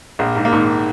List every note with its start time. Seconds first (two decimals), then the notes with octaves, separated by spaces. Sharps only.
0.19 A#1 A#3
0.36 G#2
0.45 A#3
0.53 G#2